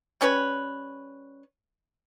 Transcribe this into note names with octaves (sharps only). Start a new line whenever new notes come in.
G3 C#4 B4 C#5